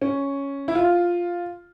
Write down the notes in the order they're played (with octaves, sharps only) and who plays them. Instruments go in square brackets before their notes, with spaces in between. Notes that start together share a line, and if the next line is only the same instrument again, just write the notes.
[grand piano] C#4
E4
F4